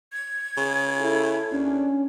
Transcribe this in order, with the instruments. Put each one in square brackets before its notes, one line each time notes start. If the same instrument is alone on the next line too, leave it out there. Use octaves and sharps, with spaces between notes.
[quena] G#6
[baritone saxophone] C#3 [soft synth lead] G#4
[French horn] E4 [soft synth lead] A4
[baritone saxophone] D#2 [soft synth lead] C#4 [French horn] D4